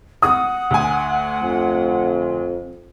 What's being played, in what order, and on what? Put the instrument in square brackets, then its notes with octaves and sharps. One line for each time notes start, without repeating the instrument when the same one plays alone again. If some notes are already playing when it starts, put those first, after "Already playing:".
[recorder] F#5 [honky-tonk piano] D#6
[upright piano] D2 G#5
[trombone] F2